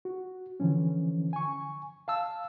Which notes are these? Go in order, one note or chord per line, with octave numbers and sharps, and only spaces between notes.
F#4
D3 E3 F3 C#4
G#5 C#6
F5 A5 E6